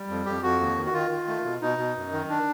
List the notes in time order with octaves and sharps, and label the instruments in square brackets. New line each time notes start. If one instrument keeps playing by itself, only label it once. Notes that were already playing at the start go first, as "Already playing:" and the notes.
Already playing: [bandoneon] G3
F2
F2 G4
F2 F#4
D#2
D#3
F#4
D#3 F4
D#3
A3
B2
B2 D#4
B2
F#2
D#3
D4